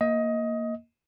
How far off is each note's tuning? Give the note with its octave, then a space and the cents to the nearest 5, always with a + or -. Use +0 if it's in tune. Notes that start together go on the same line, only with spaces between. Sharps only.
A#3 -5 D#5 +20